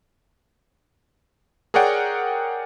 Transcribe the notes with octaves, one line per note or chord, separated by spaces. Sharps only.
G#4 A#4 C#5 D5 F#5 G5